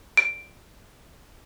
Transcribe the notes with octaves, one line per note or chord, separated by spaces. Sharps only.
D7